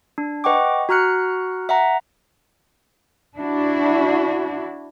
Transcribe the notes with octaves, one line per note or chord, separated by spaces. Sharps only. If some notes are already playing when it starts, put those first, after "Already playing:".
D4
B4 D#5 F#5 G5 C#6 D6
F#4 A#5 F6 F#6 C#7
E5 F#5 A#5
D4 E4 F#4